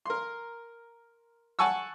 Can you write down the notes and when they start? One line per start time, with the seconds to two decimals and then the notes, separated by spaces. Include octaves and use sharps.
0.06 A#4 C6
1.59 F#5 G#5 A5 C#6 E6